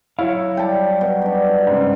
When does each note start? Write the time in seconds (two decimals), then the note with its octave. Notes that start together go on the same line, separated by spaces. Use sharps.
0.19 F#3 E4 C#5 F5
0.57 G3 G5 A5
1.01 B2
1.22 D4 G4
1.67 G#2 C#3